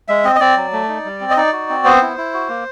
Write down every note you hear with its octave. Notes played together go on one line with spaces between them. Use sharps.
G#3 E5
C4 D#5
D#5
C4 D5
F#3
A3
D#4
G3
C4
D#5
D#4 D5
F#4
C4
B3 C5
E4
E4
F#4
A#3